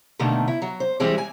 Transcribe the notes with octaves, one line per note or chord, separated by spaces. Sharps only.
B2 D3 D#3 A3 A#3
E4
F#3
C5
E3 G3 G#3 C4 G4 G#4
G#5